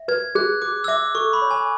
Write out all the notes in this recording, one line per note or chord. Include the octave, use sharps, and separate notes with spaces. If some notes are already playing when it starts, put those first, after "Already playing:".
Already playing: E5
B4 G#6
G#4 F#6
G#4 D6
E6
E5 D6
A4 C#6
B5
C#5
G#5